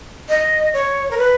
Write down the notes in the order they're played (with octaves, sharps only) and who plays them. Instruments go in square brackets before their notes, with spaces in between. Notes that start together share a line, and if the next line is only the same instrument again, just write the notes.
[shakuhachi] D#5
C#5
A#4
B4